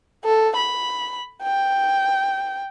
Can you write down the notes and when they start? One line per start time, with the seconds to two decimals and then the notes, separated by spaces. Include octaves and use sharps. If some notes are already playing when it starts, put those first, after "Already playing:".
0.24 A4
0.56 B5
1.43 G5